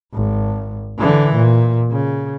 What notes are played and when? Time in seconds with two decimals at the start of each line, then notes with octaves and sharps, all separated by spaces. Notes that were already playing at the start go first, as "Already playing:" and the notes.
0.14 G#1
0.98 D3 E3
1.34 A#2
1.90 C#3